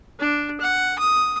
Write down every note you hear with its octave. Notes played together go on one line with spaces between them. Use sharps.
D4
F#5
D#6